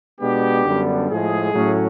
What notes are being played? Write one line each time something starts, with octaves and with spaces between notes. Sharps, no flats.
B2 G#3 B3 D4 G4
F#2 D3 G3 B3 D4
A2 F3 G#3 G#4
A2 F#3 A3 C#4